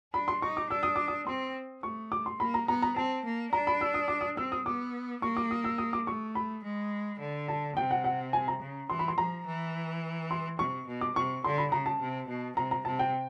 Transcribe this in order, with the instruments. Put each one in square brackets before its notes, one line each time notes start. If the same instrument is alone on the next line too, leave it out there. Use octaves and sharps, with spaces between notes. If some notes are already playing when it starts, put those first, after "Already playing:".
[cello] D4 [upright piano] B5
[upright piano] C6
[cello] D#4 [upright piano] C#6
[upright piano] D6
[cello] D4 [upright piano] E6
[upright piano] D#6
D6
D#6
[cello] C4 [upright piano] C6
[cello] A3 [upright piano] C#6
[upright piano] D6
C6
[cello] A#3 [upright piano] B5
[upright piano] A#5
[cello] B3 [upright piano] A#5
[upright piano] A#5
[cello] C4 [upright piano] A5
[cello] A#3
[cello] D4 [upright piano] A#5
[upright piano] B5
E6
D#6
D6
D#6
[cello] C4 [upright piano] E6
[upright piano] D#6
[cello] B3 [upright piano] D6
[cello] A#3 [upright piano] C#6
[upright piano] D6
D#6
E6
D#6
D6
[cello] A3 [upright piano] C#6
[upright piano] B5
[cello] G#3
D3
[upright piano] A5
[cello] C3 [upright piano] G5
[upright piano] F#5
F#5
G#5
A#5
[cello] C#3
[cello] E3 [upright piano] C6
[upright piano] B5
C6
[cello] F3 [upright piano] A#5
[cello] E3
[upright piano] C6
[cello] C3 [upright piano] C#6
[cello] B2
[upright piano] D6
[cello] C3 [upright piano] C#6
[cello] D3 [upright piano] C6
[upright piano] B5
[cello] C#3 [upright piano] A#5
[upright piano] A5
[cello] C3
B2
[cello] C3 [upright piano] A#5
[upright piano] A#5
[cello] C3 [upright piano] A5
[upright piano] G5